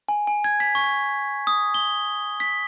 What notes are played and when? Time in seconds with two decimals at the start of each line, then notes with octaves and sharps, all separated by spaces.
0.09 G#5
0.27 G#5
0.44 G#6
0.60 B6
0.75 C#6
1.47 D#6
1.74 G7
2.40 B6